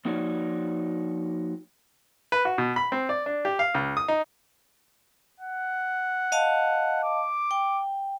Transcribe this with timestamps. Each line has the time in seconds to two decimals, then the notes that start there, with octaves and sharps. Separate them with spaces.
0.05 F3 A#3 D#4 F#4 C#5 D5
2.32 B4
2.45 F#4
2.58 B2
2.76 B5
2.92 C4
3.09 D5
3.26 D4
3.45 G4
3.59 F5
3.74 C#2
3.97 D#6
4.08 D#4
5.40 F#5
6.32 D#5 F5 A5
7.04 D6
7.51 G5